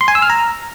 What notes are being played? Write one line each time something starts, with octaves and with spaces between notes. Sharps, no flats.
C6
G#5
E6
F6
A#5